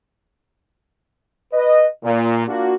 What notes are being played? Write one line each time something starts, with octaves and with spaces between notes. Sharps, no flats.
B4 D#5
A#2
A#3 D4 F4 F#4